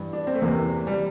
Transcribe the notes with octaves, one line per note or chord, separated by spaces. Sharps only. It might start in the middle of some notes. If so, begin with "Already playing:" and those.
Already playing: G2 E3
D4
C4
A3
E2 C3 E3 A#3
G3